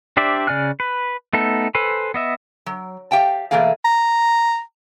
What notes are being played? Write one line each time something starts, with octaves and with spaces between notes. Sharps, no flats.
D4 G4 C5 D5 E5
C#3 D5 G#5 F6 F#6
B4
A3 B3 D#4 A4
A4 B4 C5 G#5 B5
B3 D#5 E5
F#3
G4 F5 G5 A5
B2 E3 A3 A#3 G#4 F5
A#5